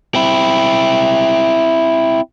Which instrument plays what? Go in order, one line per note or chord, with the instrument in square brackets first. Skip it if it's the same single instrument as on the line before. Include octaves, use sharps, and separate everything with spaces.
[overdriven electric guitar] C4 E4